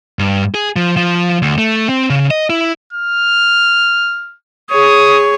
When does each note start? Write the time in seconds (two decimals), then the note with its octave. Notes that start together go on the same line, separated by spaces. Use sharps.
0.19 G2
0.55 G#4
0.76 F3
0.97 F3
1.42 D2
1.58 A3
1.89 C4
2.10 C#3
2.31 D#5
2.50 E4
2.93 F6
4.71 G#4 C#5 D#6